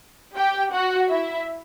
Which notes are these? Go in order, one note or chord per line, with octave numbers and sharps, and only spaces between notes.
G4 G5
F#4 F#5
E4 E5